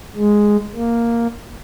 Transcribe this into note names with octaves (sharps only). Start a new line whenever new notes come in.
G#3
A#3